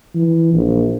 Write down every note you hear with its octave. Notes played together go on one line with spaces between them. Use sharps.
E3
A#1